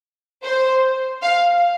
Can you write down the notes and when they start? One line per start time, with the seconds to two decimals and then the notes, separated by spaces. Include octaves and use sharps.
0.43 C5
1.22 F5